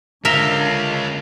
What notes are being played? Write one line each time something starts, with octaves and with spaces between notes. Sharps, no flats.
C#2 D3 F4 A#4 E5